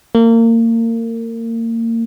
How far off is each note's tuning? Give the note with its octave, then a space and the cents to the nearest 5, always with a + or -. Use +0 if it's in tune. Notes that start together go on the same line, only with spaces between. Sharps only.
A#3 -30